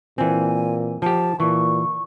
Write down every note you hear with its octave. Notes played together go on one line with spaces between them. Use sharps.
A#2 E3 C4 G#5
F3 G4 A5
A#2 E3 C#6